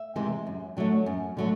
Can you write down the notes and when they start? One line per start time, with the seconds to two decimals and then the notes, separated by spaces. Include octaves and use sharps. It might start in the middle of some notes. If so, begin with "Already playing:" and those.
Already playing: E5
0.16 C3 E3 G#3 C4
0.47 F#2
0.77 D3 F#3 A3
1.06 F#2
1.37 D3 F#3 A3